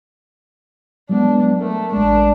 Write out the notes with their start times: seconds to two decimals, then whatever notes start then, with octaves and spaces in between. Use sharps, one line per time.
1.09 F#3 G#3 B3 D4
1.61 A3 A#4
1.92 A1 G#3 D4